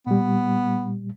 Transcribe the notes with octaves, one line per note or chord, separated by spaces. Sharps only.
A#2 G3 B3